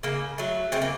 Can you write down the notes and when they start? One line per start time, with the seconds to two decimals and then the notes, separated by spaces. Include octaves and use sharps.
0.03 C#3 A#3
0.38 F#3 A3
0.72 C#3 A3 C4
0.82 A#3